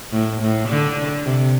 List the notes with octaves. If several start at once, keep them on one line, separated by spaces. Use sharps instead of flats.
A2
A2
D3
C3